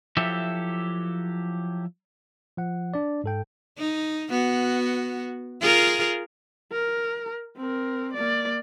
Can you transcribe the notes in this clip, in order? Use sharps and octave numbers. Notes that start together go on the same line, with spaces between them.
F3 F#3 E4 G4 A4 E5
F3 F#5
D4 D5
G#2 A4 G5
D#4
B3 F#4
F4 G#4 A#4
A#4
C4 A#4
A#3 D5